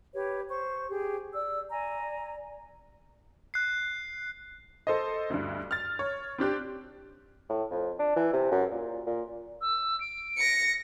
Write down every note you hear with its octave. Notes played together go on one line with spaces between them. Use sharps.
G4 B4 C#5
C5 C#6
G4 G#4
D5 E6
D5 G#5 A#5
F#6 C7
A4 C5 D#5
D2 G2
F6 A6
C#5
C4 D4 G4 F#6
A2
F2
D4
E3
C3
F#2
A#2
A#2
E6
D7
A#6 C#7